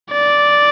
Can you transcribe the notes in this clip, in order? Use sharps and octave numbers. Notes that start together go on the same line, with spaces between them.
D5